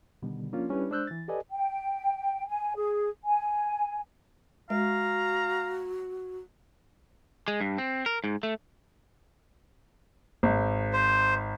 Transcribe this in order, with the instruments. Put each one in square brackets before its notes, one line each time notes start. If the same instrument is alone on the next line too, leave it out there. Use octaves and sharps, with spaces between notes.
[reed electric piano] B2 D3 D#3 G3 B3
F3 A#3 C#4 D4 F4
G3 C#4 D4 E4 G4 B4
G#3 D4 C5 E6 F#6 G6
E3 A6
G4 A4 B4 D5 D#5 G#5
[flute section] G5
G#5
G#4
G#5
[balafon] G#3 [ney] F#4 [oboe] F5 [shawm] A#5
[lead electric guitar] G#3
G2
C4
A#4
G#2
A3
[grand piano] G#1
[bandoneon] C5